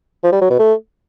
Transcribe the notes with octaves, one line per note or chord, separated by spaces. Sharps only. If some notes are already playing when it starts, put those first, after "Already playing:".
F3
G3
F#3
B2
A3